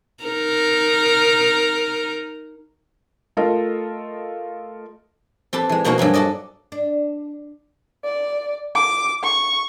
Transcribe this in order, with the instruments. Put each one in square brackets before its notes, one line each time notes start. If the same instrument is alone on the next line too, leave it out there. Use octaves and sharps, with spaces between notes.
[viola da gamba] D#4 A#4
[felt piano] A3 F4 A4 A#4 D#5
[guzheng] C4 G4 A4 B4
E3 G#3
B2 A#3 C4 D#4 F#4 A#4
G2 F#3 A#3 G#4
D4 F#4 A4 D5 D#5
[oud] D4
[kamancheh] D5
D6
C#6